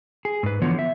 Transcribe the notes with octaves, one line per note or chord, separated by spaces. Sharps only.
G#4
G#2 B4
D3 E3 F3 B3 C#5
E5